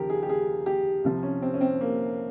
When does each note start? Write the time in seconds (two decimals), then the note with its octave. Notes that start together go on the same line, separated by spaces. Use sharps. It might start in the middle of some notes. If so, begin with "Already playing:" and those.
Already playing: D#2 C#3 F3 G4 A#4
0.10 G#4
0.23 G4
0.29 G#4
0.66 G4
1.04 C2 C3 F3
1.23 C#4
1.42 C4
1.54 C#4
1.61 C4
1.81 A#3